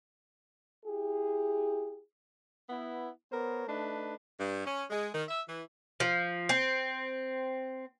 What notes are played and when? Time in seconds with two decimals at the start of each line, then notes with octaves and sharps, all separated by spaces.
0.85 E4 G4 G#4
2.69 B3 E4
3.31 B3 A#4 C5 C#5
3.67 A3 D4 D#4 B4
4.39 G2
4.65 C#4
4.90 G#3
5.12 D#3
5.28 E5
5.47 E3
6.00 F3
6.49 C4